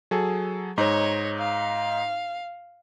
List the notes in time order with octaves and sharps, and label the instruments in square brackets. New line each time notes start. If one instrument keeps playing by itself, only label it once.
[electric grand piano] F#3 G#4 A4
[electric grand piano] G#2 D#4 [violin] C#5
[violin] F5